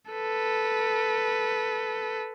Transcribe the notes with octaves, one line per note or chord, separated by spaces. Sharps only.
A4 B4